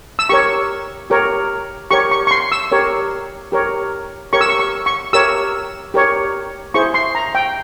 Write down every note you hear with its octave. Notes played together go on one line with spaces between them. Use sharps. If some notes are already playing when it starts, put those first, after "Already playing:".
E6
G4 A#4 C#5 C#6
G4 A#4 C#5
G4 A#4 C#5 C#6
C#6
C#6
C6
E6
G4 A#4 C#5
G4 A#4 C#5
G4 A#4 C#5 C#6
E6
C#6
C#6
C#6
G4 A#4 C#5 E6
G4 A#4 C#5
E4 G#4 C5 C#6
C6
A#5
G5